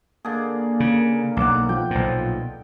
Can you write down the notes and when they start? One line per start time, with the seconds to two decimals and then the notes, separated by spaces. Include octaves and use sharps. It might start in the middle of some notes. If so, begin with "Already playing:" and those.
0.25 D3 A#3 G#4
0.80 C#3
1.37 B1 F#5 D6
1.69 F3 G5
1.91 B1 A#2